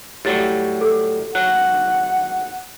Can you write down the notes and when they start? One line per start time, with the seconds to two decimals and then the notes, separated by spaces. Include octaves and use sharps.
0.25 A2 F#3 G3 G4 A6
0.81 A4
1.35 F#3 F#5 F#6